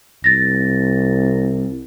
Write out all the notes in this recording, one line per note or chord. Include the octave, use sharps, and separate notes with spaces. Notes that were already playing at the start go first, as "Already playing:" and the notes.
C2 A6 A#6